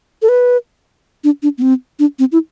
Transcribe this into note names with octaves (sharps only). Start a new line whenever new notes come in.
A4
B4
D4
D4
B3
C4
D4
C4
E4